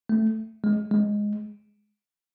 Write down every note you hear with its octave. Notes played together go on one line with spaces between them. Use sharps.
A3
G#3
G#3